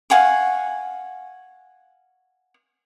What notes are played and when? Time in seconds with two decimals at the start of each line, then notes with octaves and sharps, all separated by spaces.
0.10 F5 F#5 G#5 C#6